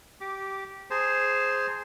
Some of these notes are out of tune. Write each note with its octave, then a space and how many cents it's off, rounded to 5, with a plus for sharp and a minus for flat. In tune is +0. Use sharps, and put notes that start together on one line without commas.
G4 -15 D6 +0
G#4 +0 C5 +0 A5 +30